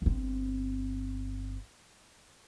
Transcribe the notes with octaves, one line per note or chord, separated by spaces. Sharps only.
G1 C4